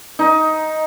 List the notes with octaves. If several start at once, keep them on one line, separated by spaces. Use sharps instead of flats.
D#4